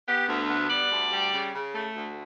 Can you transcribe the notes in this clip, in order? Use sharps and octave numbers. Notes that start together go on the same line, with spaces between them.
B3 G4
D2
B3
G3 D5
D2
G3
C#3
C#3
A3
D2